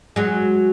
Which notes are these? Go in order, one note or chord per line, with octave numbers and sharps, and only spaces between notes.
F#3 G#3